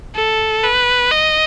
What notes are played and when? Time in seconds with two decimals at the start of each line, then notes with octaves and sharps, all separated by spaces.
0.15 A4
0.63 B4
1.11 D#5